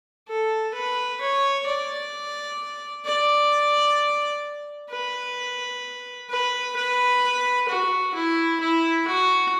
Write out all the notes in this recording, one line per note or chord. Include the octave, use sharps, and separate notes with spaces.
A4
B4
C#5
D5
D5
B4
B4
B4
F#4
E4
E4
F#4